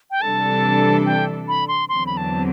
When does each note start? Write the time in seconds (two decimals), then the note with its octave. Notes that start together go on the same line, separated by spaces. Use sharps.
0.11 G5
0.21 C3 E3 G3 D4 A4 A5
1.06 G5
1.48 B5
1.68 C6
1.89 E2 D3 F#3 C4 C6
2.06 B5
2.17 A5